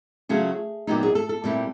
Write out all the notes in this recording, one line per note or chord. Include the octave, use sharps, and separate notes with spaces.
C#3 F#3 A3 C#4 F4 G#4
A#2 F#3 B3 D#4 G4
G#4
A4
A4
A#2 G3 C4 E4